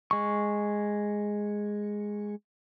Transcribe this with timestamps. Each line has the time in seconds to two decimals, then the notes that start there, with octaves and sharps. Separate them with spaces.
0.11 G#3 C#6